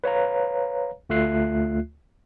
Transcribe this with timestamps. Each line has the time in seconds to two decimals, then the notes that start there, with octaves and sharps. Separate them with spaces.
0.04 B4 C#5 F5 A#5
1.10 D2 A3 F4 E5 F#6 C7